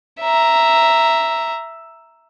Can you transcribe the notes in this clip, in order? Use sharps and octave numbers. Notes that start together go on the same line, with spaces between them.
E5 A#5